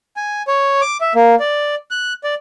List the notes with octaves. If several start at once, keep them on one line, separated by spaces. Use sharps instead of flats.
G#5
C#5
D6
E5
A#3
D5
F#6
D5